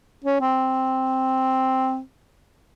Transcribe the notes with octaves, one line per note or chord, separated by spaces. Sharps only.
C#4
C4